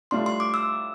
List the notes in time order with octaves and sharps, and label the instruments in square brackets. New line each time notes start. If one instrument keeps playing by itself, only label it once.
[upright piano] A2 G3 D4 F4 [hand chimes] C6
[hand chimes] C6
D6
E6